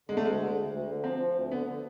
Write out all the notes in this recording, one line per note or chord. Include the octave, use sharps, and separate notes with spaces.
D3 G#3
A3
D2 G#3
D3
D2
D2
D3
F3 C4
F3
D2
D3 B3
D3